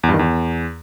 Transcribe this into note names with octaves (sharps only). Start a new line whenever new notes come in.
E2
G2
D#3
E2